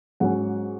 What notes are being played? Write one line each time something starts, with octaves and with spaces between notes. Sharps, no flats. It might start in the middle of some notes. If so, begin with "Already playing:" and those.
G#2 F#3 C#4 F#5